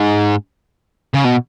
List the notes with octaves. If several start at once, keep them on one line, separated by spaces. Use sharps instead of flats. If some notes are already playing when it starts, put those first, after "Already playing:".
Already playing: G#2
C#3
B2